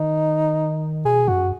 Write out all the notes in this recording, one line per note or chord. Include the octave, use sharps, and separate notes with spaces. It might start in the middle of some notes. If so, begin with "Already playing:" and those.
Already playing: D#3 D#4
B2 G#4
F#2 F#4